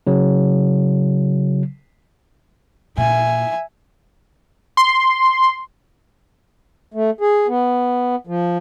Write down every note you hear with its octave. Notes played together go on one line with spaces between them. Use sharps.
C#3 F#3
A#2 E5 G#5
C6
A3
G#4
B3
F3